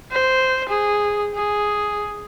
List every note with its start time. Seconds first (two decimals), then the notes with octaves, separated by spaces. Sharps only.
0.12 C5
0.69 G#4
1.35 G#4